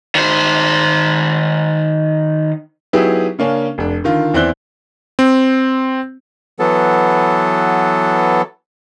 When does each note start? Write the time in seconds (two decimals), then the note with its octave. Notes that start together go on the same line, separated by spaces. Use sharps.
0.15 D#3 C5
2.93 F#3 B3 D#4 E4 G4 G#4
3.39 C#3 A#3 C#4 D4
3.78 F1 D4
4.04 D3 D#3 F4
4.34 E2 C4 E4 D5 F#6 G7
5.19 C4
6.59 E3 F#3 B3 A4